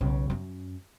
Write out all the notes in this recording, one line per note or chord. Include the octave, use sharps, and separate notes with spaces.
B1 C#3
F#2 C#4